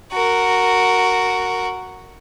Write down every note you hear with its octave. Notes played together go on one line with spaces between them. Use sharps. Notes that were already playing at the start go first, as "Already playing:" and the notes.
F#4 A#4